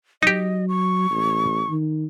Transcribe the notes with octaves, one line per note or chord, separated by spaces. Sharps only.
F#3 D#4 G4 D#5
C#6
A1
D#3